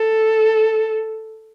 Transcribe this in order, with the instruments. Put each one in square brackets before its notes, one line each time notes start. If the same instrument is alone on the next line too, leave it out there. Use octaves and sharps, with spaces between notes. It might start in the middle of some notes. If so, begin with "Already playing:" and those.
Already playing: [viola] A4